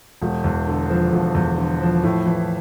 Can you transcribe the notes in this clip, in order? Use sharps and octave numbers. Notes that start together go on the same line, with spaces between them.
E1
E2
D3
F3
E1
E2
D3
F3
A2
E3